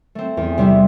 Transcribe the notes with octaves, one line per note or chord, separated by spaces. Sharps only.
A3 C4
E2
C3 G3 C4 E4